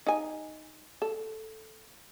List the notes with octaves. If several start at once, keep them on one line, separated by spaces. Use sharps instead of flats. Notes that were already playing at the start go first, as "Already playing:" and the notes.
D#4 G#5
A4